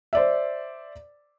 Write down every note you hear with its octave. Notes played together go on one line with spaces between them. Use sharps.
C5 D5 E5